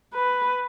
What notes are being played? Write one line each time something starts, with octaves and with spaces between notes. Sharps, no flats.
B4